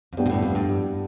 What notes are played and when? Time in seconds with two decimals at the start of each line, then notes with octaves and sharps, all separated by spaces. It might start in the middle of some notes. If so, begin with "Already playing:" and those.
0.13 F2
0.17 G2 G3 B3 D4 G4
0.26 B2
0.30 A2
0.42 F2
0.55 G2